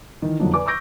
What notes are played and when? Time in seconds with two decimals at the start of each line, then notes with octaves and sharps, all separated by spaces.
0.22 D#3 E3
0.39 F2 D3 F#3 A#3 D4 D#4
0.54 B4 D5 G#5 D6
0.66 C#6 D6 E6 G6 A#6 D7